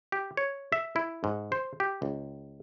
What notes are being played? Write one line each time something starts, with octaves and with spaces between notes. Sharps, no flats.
G4
C#5
E5
E4
G#2
C5
G4
C#2